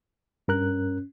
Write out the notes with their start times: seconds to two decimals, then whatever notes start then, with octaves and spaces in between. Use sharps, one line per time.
0.48 G2 C#4 A#4 F#6